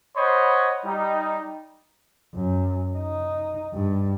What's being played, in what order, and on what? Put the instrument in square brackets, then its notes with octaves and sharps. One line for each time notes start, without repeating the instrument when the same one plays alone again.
[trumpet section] C5 C#5 D#5 F#5 B5
G3 D#4
[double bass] F#2
D#4
G2